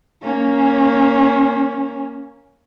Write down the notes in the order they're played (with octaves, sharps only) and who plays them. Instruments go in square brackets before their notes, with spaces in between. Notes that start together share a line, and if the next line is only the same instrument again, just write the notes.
[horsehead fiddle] A#3 C#4